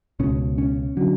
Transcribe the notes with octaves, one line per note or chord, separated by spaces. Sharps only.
C#2 B2 C#4
C#4
D3 F#3